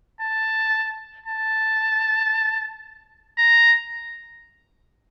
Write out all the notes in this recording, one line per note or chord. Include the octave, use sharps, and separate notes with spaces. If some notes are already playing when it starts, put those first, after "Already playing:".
A5
A5
A#5